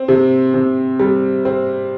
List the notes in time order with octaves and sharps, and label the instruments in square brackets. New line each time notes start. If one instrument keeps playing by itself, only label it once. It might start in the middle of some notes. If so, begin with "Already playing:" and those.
Already playing: [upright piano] C4
C3
C3
G3
C4